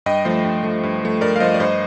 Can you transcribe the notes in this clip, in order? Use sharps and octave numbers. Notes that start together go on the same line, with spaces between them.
G2 D#5 G5
F3 A3 C5 D#5
G2
F3 A3
G2
F3 A3
G2 A#4 D5
F5
F3 A3 C5 D#5
D5
G2 C5 D#5